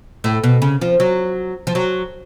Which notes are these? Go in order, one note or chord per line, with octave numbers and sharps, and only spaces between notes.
A2
B2
C#3
F3
F#3
F3
F#3